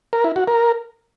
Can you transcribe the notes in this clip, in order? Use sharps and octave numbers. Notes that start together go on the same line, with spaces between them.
A#4
E4
F#4
A#4